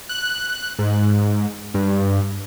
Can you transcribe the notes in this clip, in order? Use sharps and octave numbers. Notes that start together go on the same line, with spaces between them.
F#6
G#2
G2